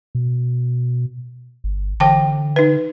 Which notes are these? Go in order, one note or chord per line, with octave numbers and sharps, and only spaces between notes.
B2
G1
D3 E3 G5 A5
D#4 B4